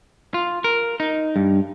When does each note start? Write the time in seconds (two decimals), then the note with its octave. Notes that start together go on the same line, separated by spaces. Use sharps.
0.34 F4
0.64 A#4
1.00 D#4
1.36 G2